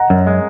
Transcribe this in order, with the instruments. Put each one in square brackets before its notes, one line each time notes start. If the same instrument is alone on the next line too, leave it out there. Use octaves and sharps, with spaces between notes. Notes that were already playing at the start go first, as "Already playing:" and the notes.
Already playing: [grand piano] D#5 F#5 A#5
[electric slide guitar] F#2
G#3